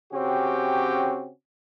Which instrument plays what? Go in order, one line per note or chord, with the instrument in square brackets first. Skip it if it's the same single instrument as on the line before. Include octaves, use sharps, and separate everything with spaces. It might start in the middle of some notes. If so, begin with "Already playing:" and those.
[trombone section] C#3 C4 C#4 F#4 G4